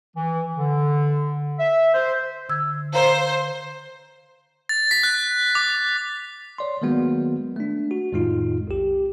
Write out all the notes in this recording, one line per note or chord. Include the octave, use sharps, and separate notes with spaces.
E3
D3
E5
C5
D3 E6 G#6
C5 F5 A#5
A6
B6
F#6
D6
C#5 D5 C6
D#3 F#3 G#3 A#3 B3 F#4
A3 D4
F#4
F2 A2 D#3 G#3 D#4 F4
B1 G4